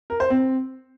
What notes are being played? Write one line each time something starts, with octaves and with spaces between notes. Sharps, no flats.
A#4
C5
C4